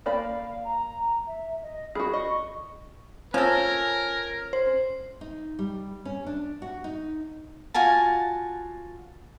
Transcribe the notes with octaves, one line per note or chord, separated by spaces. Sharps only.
A#3 D5 F5 B5
A#5
E5
D#5
F#4 G#4 B5
D#5 C#6
F3 C#4 A4 A#4
C5
D#4
G3
C#4
D4
F#4
D#4
F4 F#4 G#5 A5